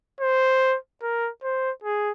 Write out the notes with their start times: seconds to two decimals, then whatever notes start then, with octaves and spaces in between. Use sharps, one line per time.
0.20 C5
1.02 A#4
1.43 C5
1.84 G#4